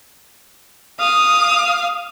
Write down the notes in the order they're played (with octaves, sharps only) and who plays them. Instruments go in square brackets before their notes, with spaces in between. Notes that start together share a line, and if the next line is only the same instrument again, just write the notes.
[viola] F5 [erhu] D#6